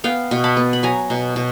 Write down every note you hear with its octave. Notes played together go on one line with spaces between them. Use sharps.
B3 F5 G5
B2
A5 B5
B3
B5
F#3 G#5 A#5
B2
B2